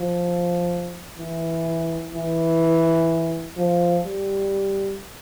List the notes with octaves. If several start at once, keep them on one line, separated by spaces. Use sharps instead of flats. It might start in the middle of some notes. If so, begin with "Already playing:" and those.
Already playing: F3
E3
E3
F3
G3